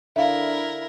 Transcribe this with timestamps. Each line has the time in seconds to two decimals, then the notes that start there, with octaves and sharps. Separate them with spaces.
0.16 D3 E4 A#4 E5 F5